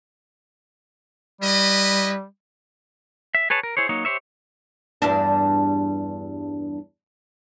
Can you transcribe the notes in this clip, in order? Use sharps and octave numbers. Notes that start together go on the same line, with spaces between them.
G3 E4 B4 D#5
E5
G#4 B4 C#5 A5
A#4
E4 G#4 C5 C#5
F#3 A#3 D#4 C#5
G4 C5 C#5 E5
E2 G2 D4